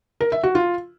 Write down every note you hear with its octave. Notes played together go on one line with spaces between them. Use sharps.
A#4
E5
F#4
F4